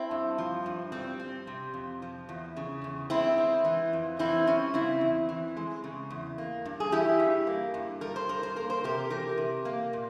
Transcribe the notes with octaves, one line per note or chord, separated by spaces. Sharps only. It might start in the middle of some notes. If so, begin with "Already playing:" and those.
Already playing: C4 E4
G2
F3
G2
G3 C4
C4
C3
F2
F3
E2
C#3
E2
G#3 C4 E4
C4
E3
F2
E3 C4 E4
G3 C#4
C#3 C4 E4
E2
E3
G#3
C#3
E2
A#3
G2
G#4
E3 E4 G4
G2
A#3
G2
G3 A#4
C5
G2 A#4
C5
A#3 A#4
C5
C3 G4 A#4
E3 G4 A#4
C3
A#3
A#2